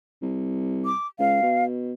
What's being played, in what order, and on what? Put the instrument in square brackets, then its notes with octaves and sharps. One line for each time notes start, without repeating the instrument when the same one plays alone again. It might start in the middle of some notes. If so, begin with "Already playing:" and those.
[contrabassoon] C2
[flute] D6
[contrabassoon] C#2 [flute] F5
[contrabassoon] B2